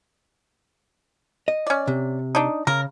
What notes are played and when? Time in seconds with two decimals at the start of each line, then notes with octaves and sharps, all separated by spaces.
1.48 D#5
1.67 C#4 D5
1.87 C3
2.35 D4 D#4
2.67 C#3 A#4